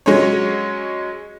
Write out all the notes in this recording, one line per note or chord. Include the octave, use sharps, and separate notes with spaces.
F#3 G#3 C#4 C#5